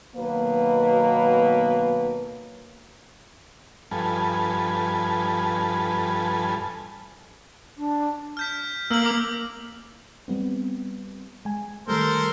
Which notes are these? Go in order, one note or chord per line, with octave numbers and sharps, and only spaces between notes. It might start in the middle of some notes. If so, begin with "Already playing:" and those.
B2 D#3 F#3 A#3 B3 B4
G2 F3 A4 B4 G#5
D4
F6 G6 B6
A#3 E6 F6 F#7
D6
G3 B3 C4
G#3 G#5
D#3 G3 A3 A4 A#4 C5